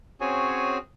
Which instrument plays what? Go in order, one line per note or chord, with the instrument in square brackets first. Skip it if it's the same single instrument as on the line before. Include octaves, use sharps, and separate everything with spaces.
[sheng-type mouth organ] C4 C#4 F#4 G#4 C#5 G#5